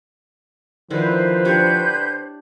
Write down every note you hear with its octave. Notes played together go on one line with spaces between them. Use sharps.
D3 D#3 F3 E4 B4 C5
D4 G4 C#5 G6